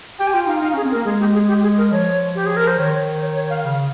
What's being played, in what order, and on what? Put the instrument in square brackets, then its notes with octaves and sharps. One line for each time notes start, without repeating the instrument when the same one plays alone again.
[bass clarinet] G4 [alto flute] G5
[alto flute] G#5
[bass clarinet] F4 [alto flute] G5
[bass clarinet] D#4 [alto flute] F5
[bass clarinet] D#4 [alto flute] F5
[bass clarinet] C#4 [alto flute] G#4
[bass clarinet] C4
[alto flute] A#4
[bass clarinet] A#3
[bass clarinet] G#3 [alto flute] G#4
[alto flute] G4
G#4
G4
G#4
A#4
[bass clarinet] F3 [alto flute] C#5
[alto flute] G4
G#4
A#4
C5
[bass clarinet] D#3 [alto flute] C#5
[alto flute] C#5
C#5
F5
[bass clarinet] C#3 [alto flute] F5